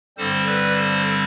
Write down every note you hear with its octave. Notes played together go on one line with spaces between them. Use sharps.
G2 D3 G3 C4 A4 C5
B4 D5
A4 C5